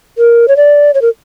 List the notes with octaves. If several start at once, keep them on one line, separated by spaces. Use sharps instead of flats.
A#4
C#5
D5
C#5
A#4